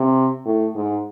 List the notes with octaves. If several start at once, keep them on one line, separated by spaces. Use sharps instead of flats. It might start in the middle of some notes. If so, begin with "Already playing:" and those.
Already playing: C3
A2
G#2